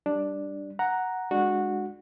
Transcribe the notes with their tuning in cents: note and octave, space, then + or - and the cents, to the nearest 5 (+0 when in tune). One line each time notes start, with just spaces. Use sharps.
G3 +0 D4 +0
F#5 +0 A#5 +0
G#3 +0 D4 +15 F#4 -10